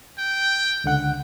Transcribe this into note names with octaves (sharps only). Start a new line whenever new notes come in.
G5
C#2 D3 F#5